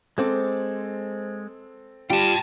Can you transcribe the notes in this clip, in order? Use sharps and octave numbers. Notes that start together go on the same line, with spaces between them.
G#3 C4 A4 C5 D6
G3 F4 G5 A5